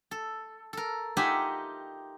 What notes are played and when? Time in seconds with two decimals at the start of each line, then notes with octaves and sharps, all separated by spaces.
0.11 A4
0.73 A4 A#4
1.17 D#4 F4 G4 E5 F#5 G#5